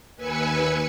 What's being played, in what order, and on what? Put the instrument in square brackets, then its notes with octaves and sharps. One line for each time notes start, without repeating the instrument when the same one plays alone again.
[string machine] D#2 B4 G#5 E6 C#7